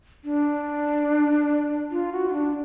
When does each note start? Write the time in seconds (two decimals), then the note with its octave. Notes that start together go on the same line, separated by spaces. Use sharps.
0.24 D4
1.91 F4
2.12 F#4
2.29 F4
2.33 D4